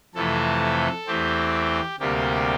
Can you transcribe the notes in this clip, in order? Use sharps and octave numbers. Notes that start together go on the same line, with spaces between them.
F2 C3 E3 A3 A4
E2 E3 A3 C4 G4
D2 C3 G3 A#3 G4